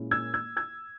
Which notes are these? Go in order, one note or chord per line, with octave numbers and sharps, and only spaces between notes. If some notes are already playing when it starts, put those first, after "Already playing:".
Already playing: A#2 G#3 C#4 E4
E6 G#6
E6 G#6
E6 G#6